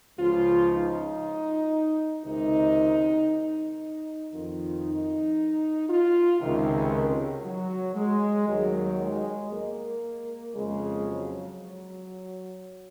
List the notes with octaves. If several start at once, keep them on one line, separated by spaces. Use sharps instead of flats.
C#2 C#3 F3 F4
D#4
C#2 C3 D#3 D#4
D#4
F2 D#3 F4
D#4
F4
C#2 C3 D#3
F#3
G#3
D#2 D#3 F#3
G#3
A#3
F2 C#3 F3 G#3
F#3